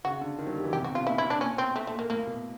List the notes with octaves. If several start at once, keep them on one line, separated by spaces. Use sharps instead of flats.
C#3 F#4
D3
D#3
F#3
G3
E3
C3 G4
B2
F#4
C3
B2 F4
A#2 E4
E4
D4
A#2 C#4
B2 C4
A3
A3
A#2
A#3
A2 A#3
B2